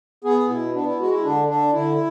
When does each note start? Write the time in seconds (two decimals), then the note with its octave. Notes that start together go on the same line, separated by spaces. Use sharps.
0.24 B3 G#4
0.49 B2 E4
0.74 B3 D4
0.86 E4
0.99 G#3 F#4
1.12 E4
1.23 D3 D4
1.48 D3 D4
1.73 D3 E4